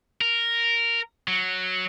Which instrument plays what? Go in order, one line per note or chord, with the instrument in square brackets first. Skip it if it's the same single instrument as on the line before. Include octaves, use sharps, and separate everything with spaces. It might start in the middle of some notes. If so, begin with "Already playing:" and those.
[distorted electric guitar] A#4
F#3